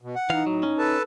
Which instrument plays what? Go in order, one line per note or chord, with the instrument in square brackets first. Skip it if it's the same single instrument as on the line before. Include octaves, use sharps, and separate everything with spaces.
[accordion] B2
F#5
[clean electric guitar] E3 F5 [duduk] D#4
[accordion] A2 [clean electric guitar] F#3
[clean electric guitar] C#4
[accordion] A4 B4 A5